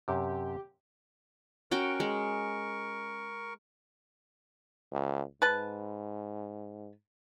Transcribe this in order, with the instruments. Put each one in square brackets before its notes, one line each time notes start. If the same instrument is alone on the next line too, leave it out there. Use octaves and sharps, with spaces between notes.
[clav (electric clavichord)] F#2 C3 [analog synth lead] G4
[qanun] C#4 F#4 G5 [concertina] A#4 C#6
[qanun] G#3
[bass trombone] C#2
[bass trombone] G#2 [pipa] B4 A5